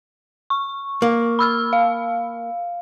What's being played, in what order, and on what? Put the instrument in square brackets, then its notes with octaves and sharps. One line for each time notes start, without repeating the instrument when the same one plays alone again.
[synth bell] C#6
[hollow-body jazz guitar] A#3
[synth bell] B5 E6 F6
F5